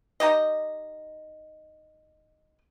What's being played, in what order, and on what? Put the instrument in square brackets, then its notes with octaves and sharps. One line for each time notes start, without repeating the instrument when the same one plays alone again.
[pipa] D#4 G4 D#5